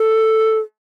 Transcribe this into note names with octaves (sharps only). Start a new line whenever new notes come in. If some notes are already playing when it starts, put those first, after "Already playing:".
Already playing: A4